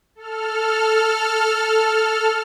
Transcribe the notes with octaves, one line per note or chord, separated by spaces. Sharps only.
A4 F6